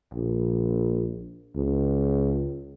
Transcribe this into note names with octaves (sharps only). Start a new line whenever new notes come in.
A#1
C#2